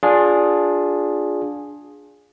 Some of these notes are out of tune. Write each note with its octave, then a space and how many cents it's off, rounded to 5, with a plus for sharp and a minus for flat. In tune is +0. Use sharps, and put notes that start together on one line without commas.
D4 -10 F4 +25 G#4 +0